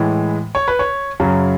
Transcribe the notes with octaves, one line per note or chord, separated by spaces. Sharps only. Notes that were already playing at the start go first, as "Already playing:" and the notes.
Already playing: A2 E3 G#3
C#5
B4
C#5
F#2 C#3 F#3